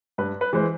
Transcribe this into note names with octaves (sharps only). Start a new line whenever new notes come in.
G2 B4
B4
E3 G#3 C5